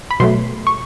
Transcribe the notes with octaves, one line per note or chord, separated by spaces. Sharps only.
B5
B2 F#3 A3 C6
C#6